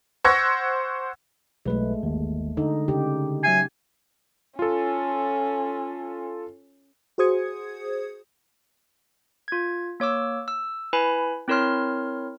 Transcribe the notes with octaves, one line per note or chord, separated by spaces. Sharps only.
C5 F#5 C#6 E6 G#6 A#6
B1 G#3 A3 B4
G1 D#2
D3 D#4
C#3 G4
F#3 E5 G#5 C7
C#4 F4 A4
F#4 G#4 C5 D#6 G#6 C#7
F4 G#6
A#3 C#5 D6 E6
E6
E4 B4 G#5 B5
C4 E4 A#4 C#5 C6 F6